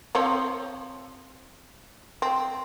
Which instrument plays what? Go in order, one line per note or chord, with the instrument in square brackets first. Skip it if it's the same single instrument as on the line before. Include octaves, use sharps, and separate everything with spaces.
[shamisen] F3 C4 C#5
C4